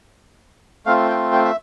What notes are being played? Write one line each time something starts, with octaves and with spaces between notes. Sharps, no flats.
A3 C4 F4 F5
G5
G5
E5